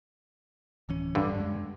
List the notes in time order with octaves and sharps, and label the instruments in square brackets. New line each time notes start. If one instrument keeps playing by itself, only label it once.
[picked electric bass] D1 E3 C#4
[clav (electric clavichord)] G2 D3
[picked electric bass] F#2 G#3